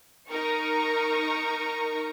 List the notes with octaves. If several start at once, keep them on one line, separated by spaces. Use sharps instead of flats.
D#4 A#4 A#5 C#6